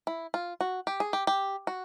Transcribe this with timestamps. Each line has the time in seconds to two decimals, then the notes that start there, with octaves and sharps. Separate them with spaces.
0.07 E4
0.34 F4
0.61 F#4
0.87 G4
1.00 G#4
1.13 G4
1.27 G4
1.67 F#4